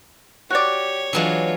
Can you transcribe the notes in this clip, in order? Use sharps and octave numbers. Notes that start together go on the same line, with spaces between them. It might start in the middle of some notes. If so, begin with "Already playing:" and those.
F#4 G4 C#5 D5
E3 F#3 G#3 D4 F4